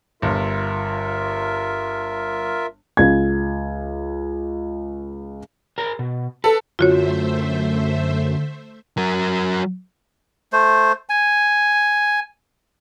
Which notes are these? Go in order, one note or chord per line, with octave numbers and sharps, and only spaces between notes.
G1 F4 A#4 E5
C#2 G#6
G#4 A#4 A#5
B2
A4 B4
F#2 D3 A3 F4 F#4 C5 C#5 E5
F#3 A#4
A3 C5
G#5